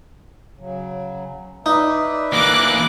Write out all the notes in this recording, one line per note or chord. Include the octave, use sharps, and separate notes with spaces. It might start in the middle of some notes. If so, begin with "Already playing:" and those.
C#3 F#3
D#4 B4 D5 E5
E3 A#3 D6 F#6